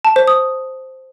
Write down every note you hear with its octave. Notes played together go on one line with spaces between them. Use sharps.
A5
C5
D#6